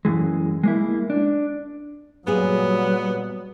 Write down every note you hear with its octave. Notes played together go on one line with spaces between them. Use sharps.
F#2 E3 G#3
G#3 A#3 E4
D4
A#2 F#3 G3 B3 G#4